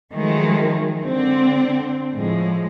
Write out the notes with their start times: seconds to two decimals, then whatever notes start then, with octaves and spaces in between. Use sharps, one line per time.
0.13 D#3 F3 F#3 G#3 A3
1.03 D3 C4
2.12 A2 F3 G#3